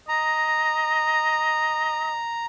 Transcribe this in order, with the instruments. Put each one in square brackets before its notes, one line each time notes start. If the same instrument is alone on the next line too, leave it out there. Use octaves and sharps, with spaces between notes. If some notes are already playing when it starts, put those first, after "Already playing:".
[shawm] D#5 [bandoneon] A#5